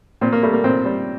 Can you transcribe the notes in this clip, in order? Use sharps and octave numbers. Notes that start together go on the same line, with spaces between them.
A#2 C4
A#3
G3 A3
A#3
A#2 C4
G3